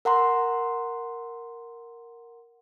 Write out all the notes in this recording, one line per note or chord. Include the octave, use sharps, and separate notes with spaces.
A#4 F#5 A#5 C6